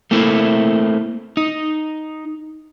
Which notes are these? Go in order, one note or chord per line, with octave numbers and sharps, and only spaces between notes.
A3 A#3 C4 E4
D#4